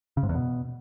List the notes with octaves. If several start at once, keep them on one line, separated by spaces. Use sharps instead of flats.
C#3
G#2
E2
B2